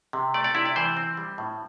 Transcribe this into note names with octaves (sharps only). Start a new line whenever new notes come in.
C3
A3 D5
D5
C3 E4
D5
E3 C5
C4
G3
A2